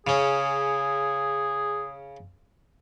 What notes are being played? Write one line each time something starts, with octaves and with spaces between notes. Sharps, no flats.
C#3 C#4 G#4